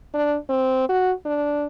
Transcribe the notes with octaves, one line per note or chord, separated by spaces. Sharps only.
D4
C4
F#4
D4